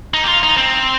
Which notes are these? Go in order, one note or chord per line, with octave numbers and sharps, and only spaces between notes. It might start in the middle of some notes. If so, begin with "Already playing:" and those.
D#4
G4
F4
D#4
C4